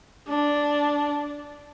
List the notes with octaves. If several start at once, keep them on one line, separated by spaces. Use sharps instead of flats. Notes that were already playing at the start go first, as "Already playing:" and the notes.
D4